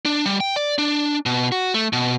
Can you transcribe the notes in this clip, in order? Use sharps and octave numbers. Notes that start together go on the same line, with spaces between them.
D4
G3
G5
D5
D4
B2
F#4
A3
B2